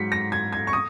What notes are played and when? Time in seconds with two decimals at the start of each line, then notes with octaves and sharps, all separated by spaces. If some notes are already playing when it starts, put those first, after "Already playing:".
Already playing: G#2 F#3 B6 C#7
0.12 A#6
0.32 G#6
0.53 G#6
0.67 C#6
0.73 D#6